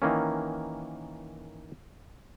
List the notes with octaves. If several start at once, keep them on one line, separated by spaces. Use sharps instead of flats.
D#3 E3 A#3 C#4